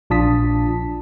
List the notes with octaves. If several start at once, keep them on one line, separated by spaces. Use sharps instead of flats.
A#1 D4 F4 A5 D#6 B6